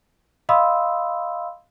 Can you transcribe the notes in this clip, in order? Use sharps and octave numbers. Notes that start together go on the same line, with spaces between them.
D#5 F5 B5 C6 D#6 E6